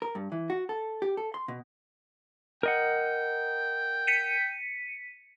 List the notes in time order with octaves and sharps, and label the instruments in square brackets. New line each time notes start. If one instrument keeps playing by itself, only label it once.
[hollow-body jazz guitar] A#4
G2
E3
F#4
A4
G4
A4
C6
B2
[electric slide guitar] A#4 D#5 F#5 [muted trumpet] G5
[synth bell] B6 C#7 D#7